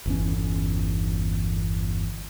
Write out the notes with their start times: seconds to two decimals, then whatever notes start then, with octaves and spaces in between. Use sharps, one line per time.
0.06 G1 E2 C#4